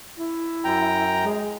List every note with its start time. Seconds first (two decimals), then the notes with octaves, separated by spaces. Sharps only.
0.18 E4
0.64 F#2 G5 A#5
1.24 G#3